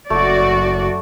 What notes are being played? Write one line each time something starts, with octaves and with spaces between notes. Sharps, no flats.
F#1 F#2 A3 F#4 D5